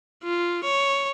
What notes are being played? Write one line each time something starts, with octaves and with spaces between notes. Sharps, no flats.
F4
C#5